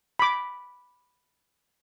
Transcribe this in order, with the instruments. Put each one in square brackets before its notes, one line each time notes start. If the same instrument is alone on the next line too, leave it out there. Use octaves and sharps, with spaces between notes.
[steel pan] B5 D6